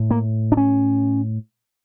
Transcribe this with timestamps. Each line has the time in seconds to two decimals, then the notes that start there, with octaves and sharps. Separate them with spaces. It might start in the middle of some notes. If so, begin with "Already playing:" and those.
Already playing: A2
0.11 A#3
0.52 D4
0.57 C#4